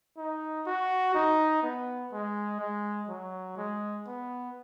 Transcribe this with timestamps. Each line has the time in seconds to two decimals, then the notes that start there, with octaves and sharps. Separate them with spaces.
0.17 D#4
0.66 F#4
1.14 D#4
1.63 B3
2.12 G#3
2.60 G#3
3.09 F#3
3.57 G#3
4.06 B3